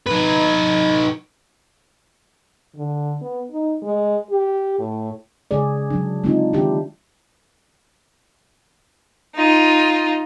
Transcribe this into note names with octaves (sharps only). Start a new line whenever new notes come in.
D#4 B4
D3
B3
D#4
G#3
G4
A2
C#3 G#3 G#4 D5
F#3 D4
G#3 C4 D4 D#4 F4
D#3 D4 E4 G4
D#4 F4